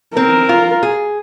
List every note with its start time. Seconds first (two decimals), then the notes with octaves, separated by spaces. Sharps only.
0.16 C4 A#4
0.49 F4
0.83 G#4